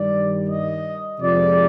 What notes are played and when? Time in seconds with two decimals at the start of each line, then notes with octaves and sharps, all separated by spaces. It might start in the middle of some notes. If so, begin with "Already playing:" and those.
Already playing: G2 D#3 G3 D5
0.49 D#5
1.20 F2 C3 F3 G#3 D5